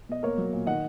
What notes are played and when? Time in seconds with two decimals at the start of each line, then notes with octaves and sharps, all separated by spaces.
0.09 B2 D#5
0.23 A#3 A#4 C#5
0.38 F#3
0.53 A#2
0.66 D#3 D#5 F#5